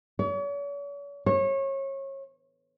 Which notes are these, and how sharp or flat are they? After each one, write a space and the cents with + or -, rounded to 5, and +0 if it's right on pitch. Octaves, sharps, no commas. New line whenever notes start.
C#5 +40
C#5 -30